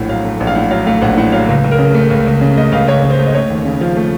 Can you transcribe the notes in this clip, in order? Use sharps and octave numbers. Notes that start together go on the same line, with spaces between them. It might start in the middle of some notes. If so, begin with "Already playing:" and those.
Already playing: A#1 A2 A3 F#5
F#3 F5
A3
A#1
F5
A2 F#5
F#3 F5
A3 F5
A#1 F#5
A2 F#5
F#3 F5
C#2
C#2
A#4
C#3
A3
C#2
C#2
C#3
A3 D#5
C#2 F5
C#2 C#5
C#3
C5
A3
D#5
A3 C#5
D#2
C#3
F3 F5
A3